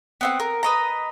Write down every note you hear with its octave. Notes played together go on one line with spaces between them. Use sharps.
B3 C4 F#5
A#4
B4 D#5 A#5